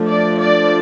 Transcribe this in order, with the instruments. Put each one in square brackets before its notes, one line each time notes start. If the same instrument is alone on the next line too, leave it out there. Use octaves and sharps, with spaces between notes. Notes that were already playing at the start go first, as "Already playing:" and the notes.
Already playing: [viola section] F3 A3 D4
D5
D5